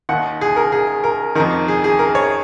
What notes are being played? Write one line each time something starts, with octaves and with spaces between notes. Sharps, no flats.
D#2 D#3 F#5
G#4
A#4
G#4
A#4
F2 D#3 A#4
G#4
G#4
A#4
C#5